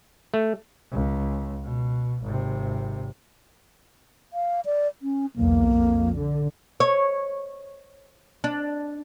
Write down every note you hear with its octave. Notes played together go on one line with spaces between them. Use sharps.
A3
C#2
B2
G#1 C3
F5
D5
C#4
B1 E2 A#3
F2
D3
C#5
D4